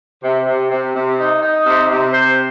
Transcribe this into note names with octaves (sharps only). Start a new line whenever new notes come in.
C3
C3
C3
C3
D#4
D#4
C3
C3
C5